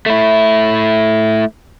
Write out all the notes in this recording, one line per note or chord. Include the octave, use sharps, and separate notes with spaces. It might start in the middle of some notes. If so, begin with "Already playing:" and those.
A3 E4